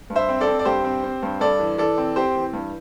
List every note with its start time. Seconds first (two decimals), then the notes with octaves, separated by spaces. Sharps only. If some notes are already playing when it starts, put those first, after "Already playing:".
0.10 G2
0.16 C5 E5
0.29 C4
0.41 A4 D5
0.47 C4
0.59 D5
0.65 G2 G4 C5
0.84 C4
1.04 C4
1.23 G2
1.40 G2 A4 D5
1.59 E3
1.78 E3 A4 D5
1.98 C4
2.16 C4 G4 C5
2.35 E3
2.53 G2